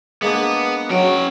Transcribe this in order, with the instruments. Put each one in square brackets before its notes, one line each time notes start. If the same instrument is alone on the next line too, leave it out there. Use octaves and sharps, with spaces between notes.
[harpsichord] G#3 A#3 D4 [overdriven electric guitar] B3
[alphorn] F#3 [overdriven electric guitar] C#4 G5